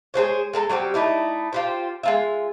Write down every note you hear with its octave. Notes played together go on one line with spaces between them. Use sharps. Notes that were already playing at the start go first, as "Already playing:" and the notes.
G#3 G#4 C5 C#5
G#3 A4 A5 A#5
F#3 G3 C4 G4
A3 D#4 E4 D5
F4 G4 C5
G#3 F4 E5